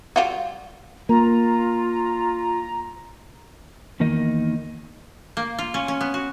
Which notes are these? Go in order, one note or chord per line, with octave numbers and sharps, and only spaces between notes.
G3 F4 F#4
A#3 F4 A#5
E2 D#3 A#3 D#4
A#3
F4
C#4
C#4
B3
F#4